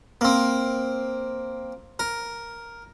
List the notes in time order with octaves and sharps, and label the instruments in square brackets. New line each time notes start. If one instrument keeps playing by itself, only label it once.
[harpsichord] A#3 C4
A#4